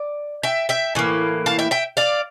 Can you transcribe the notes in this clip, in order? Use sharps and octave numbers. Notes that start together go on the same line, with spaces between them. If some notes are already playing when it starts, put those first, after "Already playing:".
Already playing: D5
E5 G5
E5 G5
A2 E3 A#3
F5 A5
E5 G5
E5 G5
D5 F5